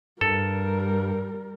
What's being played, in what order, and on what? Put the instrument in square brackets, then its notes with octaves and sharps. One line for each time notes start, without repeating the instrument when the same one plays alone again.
[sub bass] G2 [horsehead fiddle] G3 A#4 [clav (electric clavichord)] A4